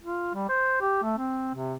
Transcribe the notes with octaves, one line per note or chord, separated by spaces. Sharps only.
F4
G3
C5
G4
A3
C4
C3